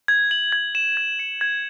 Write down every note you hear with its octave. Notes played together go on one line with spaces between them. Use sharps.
G#6
F#7
G#6
E7
G#6
C#7
G#6